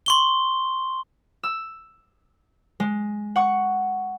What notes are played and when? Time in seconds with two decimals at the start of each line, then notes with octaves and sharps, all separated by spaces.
0.06 C6 C#6 G7
1.43 E6
2.80 G#3
3.36 F#5 C#6